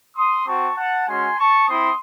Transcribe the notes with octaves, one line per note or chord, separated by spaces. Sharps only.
C6 D#6
C4 F#4 A5 C#6
F#5 A5
G#3 C#4 F#4 G#5 C6
A5 C#6
C4 E4 C6 D#6